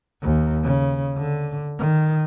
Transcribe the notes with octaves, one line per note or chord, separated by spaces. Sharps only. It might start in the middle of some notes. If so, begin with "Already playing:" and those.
D#2
C#3
D3
D#3